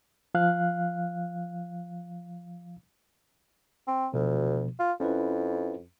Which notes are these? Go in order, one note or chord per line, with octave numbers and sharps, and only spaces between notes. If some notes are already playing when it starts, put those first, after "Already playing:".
F3 F5 F#6
C4
D2 B2 F3
F4
F2 C#4 E4 B4